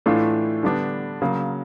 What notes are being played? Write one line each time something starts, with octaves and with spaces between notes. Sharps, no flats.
A2 E3 A3 D4 F4
D3 G3 B3 D4
C#3 F#3 A#3